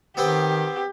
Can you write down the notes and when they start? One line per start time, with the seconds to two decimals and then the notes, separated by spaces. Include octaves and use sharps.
0.17 D#3 B3 C4 G4 C6